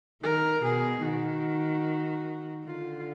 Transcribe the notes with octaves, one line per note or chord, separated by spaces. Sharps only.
D#3 A#4
B2 G#4
D#3 F#4
D3 F4